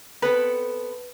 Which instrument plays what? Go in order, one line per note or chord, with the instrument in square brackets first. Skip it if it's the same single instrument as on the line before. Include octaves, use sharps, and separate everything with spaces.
[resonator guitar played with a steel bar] B3 C4 A4 [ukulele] B4